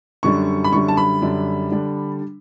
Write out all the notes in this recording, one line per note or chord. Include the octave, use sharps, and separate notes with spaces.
F#2 D3 G3 D4 C#6
B5
F#2 D3 G3 D4 C#6
A5
B5
F#2 D3 G3 D4
D3 G3 D4